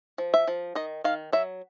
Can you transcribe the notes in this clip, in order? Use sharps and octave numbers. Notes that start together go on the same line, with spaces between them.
F3
E5
F3
D#3 D#5
D#3 F5
F#3 E5